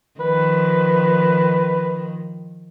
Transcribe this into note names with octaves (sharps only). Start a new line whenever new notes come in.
D#3 F3 B4